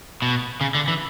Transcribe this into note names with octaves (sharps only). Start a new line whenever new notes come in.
B2
C#3
D3
E3